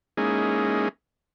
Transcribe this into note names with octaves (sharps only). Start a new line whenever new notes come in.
G#3 A#3 C#4 D#4 E4 G#4